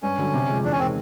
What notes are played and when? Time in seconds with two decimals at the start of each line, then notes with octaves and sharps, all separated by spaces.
0.03 G2 C#4
0.18 D3 F#3
0.34 C3
0.49 F3 G#3
0.64 E2 D4
0.72 C#4
0.79 C3 D#3 G#3 C4